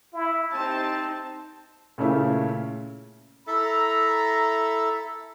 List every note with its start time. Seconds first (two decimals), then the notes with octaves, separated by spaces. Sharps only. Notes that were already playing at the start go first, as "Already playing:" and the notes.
0.13 E4
0.53 C4 D#4 G4 A5
1.98 A#2 C#3 A3 C#4 E4
3.47 E4 A4 E5 A#5